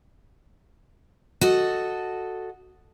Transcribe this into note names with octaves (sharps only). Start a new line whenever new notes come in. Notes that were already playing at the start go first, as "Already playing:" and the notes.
F#4 A4 D#5